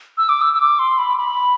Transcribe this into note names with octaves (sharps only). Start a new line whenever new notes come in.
E6
D6
E6
E6
D6
C6
B5
B5